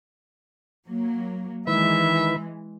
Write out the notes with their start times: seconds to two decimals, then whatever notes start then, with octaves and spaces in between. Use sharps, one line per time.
0.88 F#3 A#3
1.67 D#3 E3 G#3 E4 B4 E5